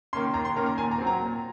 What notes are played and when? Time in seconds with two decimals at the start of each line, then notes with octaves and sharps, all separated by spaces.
0.13 D#3 A#3 C#4 C6
0.34 D#2 A#5
0.45 C6
0.56 D#3 A#3 C#4 A#5
0.66 A#5
0.78 A#2 G#5
0.91 A#5
0.98 F#3 C4
1.07 A#5
1.21 A#2